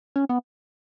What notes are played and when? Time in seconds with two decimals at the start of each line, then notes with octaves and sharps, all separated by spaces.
0.16 C#4
0.29 B3